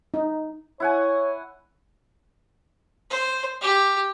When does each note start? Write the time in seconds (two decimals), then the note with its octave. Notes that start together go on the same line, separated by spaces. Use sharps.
0.14 D#4
0.80 E4 C#5 F#5 G#5
3.10 C5
3.61 G4